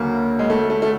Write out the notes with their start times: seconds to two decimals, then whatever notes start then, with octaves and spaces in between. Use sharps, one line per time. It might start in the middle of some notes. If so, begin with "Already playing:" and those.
Already playing: D2 C#3 F#3 A#3
0.39 G#3
0.50 A3
0.70 A3
0.82 A3